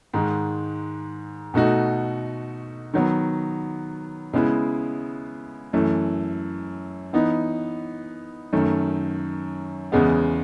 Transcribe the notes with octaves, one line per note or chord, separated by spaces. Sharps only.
G#2 D#3 G#3
B2 A3 D#4 F#4
D#3 F#3 B3
C#3 G#3 B3 E4
F#2 E3 A3
E3 B3 D#4
F#2 D#3 A3
E2 C#3 G#3 B3